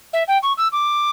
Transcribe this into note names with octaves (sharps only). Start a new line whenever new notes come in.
E5
G5
C#6
E6
D6